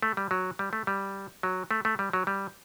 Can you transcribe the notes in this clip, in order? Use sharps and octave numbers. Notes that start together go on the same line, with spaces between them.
A3
G3
F#3
G3
A3
G3
F#3
A3
A3
G3
F#3
G3